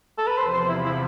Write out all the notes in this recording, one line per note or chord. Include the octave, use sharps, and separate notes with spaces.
A4
B4
E2 C3 F3 C5
C5
E4
E4